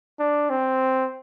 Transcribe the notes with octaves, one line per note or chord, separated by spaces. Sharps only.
D4
C4